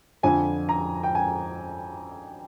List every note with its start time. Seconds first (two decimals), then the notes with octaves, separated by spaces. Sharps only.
0.23 F2 D3 F3 G#5
0.69 A#5
1.03 G5
1.15 G#5